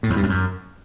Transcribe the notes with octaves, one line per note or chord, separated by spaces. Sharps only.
A2
E2
G2
F2
F#2